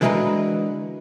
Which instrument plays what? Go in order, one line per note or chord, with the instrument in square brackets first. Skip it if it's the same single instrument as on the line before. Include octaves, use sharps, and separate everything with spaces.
[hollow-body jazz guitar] D3 E3 G#3 F#4 A#4 B4